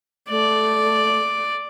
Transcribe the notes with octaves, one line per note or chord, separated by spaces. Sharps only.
A3 D5